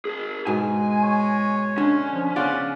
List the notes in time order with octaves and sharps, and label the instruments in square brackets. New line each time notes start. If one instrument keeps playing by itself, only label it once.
[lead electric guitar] G#4 A#4
[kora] G#2 B2 [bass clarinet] G#3 [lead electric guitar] G#5
[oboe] C#5
[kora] D3 [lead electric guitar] C#4
[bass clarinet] F3
[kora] C#3 F4 D5 [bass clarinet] B3 [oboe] F#5